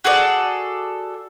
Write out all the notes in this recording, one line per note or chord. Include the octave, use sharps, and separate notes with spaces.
F#4 G#4 A4 D5